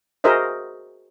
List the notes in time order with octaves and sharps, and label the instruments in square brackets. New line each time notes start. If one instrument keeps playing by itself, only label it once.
[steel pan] F#4 G#4 A#4 C5 D#5 E5